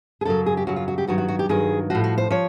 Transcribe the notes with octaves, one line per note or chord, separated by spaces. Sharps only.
G#4
F#2 C#3 F#3 A4
G#4
G4
F#2 C#3 F#3 F#4
F4
F#4
G4
G2 D#3 F#3 F#4
F#4
F#4
G4
G2 D#3 F#3 G#4
A2 F3 F#4
F#4
C5
F3 C#5